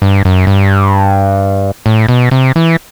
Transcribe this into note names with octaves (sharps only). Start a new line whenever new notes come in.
G2
F#2
G2
A2
B2
C3
E3